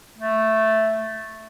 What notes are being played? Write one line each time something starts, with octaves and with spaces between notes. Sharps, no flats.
A3